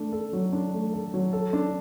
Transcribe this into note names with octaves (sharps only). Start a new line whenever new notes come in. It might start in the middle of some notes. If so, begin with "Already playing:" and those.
Already playing: A3 D4
A4
F#3
D4
A3
A4
F#3
A4
D4